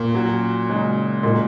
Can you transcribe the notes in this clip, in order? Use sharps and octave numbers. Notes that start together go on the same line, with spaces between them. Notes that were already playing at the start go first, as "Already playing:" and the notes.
Already playing: A#2
F#3 C#4 F#4
C#3 G#3 D#4 F#4
A#2 G#3 D#4 F#4